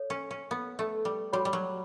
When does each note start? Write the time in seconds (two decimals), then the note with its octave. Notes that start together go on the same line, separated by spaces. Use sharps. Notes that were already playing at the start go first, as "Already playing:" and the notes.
Already playing: A4 C#5
0.10 C#4
0.31 C#4
0.51 B3
0.79 A3
1.05 G3
1.33 G3 F#4 C#5 F#5 B5
1.45 G3
1.53 F#3